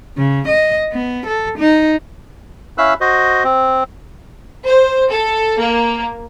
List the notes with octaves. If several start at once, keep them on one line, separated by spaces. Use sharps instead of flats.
C#3
D#5
B3
A4
D#4
C#4 E4 E5 F5 E6 F#6
F#4 C5 D#5
C4
C5
A4
A#3